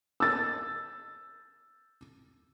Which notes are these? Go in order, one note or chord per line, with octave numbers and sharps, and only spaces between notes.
E6 A6